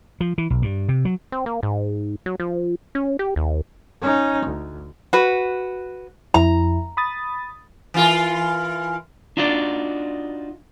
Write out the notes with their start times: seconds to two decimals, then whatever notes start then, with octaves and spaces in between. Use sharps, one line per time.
0.20 F3
0.38 E3
0.50 B1
0.62 G2
0.89 C3
1.05 F#3
1.32 C4
1.46 A#3
1.63 G#2
2.26 F#3
2.40 F3
2.95 C#4
3.19 G4
3.36 D#2
4.02 C#4 D#4
4.45 D2
5.13 F#4 B4
6.34 F2 E4 A#5
6.97 B5 D#6 A6
7.94 E3 F4 A#4
9.37 D4 D#4 F4 F#4 C5 D5